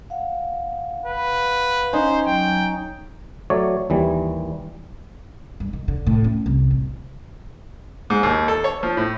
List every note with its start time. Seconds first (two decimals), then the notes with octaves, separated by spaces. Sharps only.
0.10 F5 F#5
1.06 B4
1.93 C#4 D#4 C5 C#5
2.26 F#3 G5
3.50 F#3 A3 C#5 D5
3.90 D#2 E3 G3
5.60 G2
5.73 D#3
5.88 D3
6.06 A2
6.24 C#4
6.46 C2
6.71 A1
8.10 G#2
8.23 D#2
8.48 A4
8.64 C#5
8.83 F3
8.97 A2